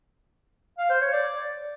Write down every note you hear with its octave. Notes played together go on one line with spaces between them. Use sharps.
F5
C5
C#5
D5